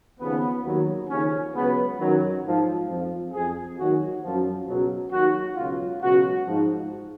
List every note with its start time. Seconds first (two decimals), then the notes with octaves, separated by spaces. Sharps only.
0.20 D#2 C#3 F3 B3
0.65 D#2 D#3 F#3
1.10 D#2 C#3 F3 C#4
1.54 C#2 C#3 F#3 B3
1.99 F#2 D#3 F#3
2.44 G#2 F3
2.88 F2 F3
3.32 F2 F3 G#4
3.78 D#2 D#3 F#3 F#4
4.22 F#2 F3
4.67 C#2 B2 F#3
5.11 D#2 D#3 F#3 F#4
5.56 C#2 B2 F#3 F4
6.02 C#2 B2 F#3 F#4
6.46 G#2 F3